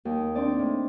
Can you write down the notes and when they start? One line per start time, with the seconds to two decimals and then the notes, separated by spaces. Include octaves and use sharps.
0.05 D#2
0.35 C4 D4 D#4 D5 D#5
0.58 A2